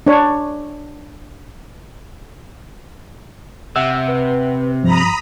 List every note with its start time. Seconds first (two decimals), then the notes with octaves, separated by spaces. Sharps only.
0.07 D4 C#5
3.76 C3 E5 F#5 E6
4.08 B4
4.83 G2 F3 A#5 B5 D#6